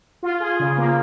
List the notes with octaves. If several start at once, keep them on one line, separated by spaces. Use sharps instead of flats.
F4
G#4
C#3
A#3